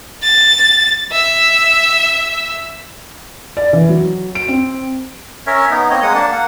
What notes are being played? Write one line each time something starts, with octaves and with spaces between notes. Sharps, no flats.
A6
E5
D5
E3
F#3
D7
C4
C#4 A#4 C#5 E5
B3 D#4
A#3 C4 C#5 D#5
G#3 A#3 F#5 D#6
A#3 D4 A5
A#3 F#5